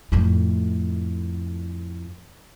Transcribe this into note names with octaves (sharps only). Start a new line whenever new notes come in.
F2 A2